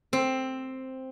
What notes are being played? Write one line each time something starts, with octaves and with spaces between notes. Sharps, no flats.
C4